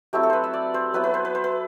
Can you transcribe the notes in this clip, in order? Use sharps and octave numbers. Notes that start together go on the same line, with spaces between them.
F#3 A3 C4 E4 G4
A4
B4 C5
E5
D5
C5
F#3 B3 E4 B4
B4
C5
B4
C5
B4